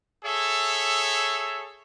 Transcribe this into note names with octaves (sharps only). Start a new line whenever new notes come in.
G#4 A4 C#5 E5